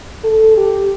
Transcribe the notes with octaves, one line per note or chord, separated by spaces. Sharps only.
A4
G4